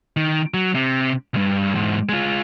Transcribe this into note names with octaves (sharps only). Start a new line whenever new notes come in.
D#3
F#3
C3
C2 G2
E2 G#2
G#3 F4